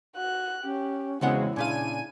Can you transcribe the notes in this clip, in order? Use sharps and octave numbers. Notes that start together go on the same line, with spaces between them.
F#4 F#6
C#4 G4
E2 C#3 G#3 B3 C4 E4 F#4 F#5
A#2 C#3 D4 F5 G#5 D#7